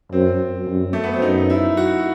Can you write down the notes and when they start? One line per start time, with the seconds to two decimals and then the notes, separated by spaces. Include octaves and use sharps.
0.12 F#2 C4
0.67 F#2
0.93 A3
1.04 B3
1.13 C4
1.22 F#2 D#4
1.50 E4
1.77 F#4